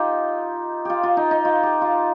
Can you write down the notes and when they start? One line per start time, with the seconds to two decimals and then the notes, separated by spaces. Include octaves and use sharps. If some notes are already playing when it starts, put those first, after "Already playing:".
Already playing: D#4 F4 G4
0.85 F4 G4
1.03 F4
1.17 D#4
1.31 D#4
1.45 F4
1.63 G4
1.81 F4